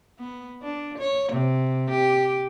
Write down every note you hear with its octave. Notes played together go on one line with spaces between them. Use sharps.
B3
D4
C#5
C3
G4